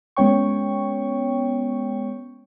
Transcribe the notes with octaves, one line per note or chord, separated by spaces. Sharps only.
G#3 B3 C#4 C#5 G5 C#6